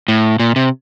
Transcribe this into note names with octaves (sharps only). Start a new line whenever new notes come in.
A2
A#2
C3